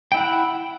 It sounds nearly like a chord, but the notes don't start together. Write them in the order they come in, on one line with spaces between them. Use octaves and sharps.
G5 E4 F#5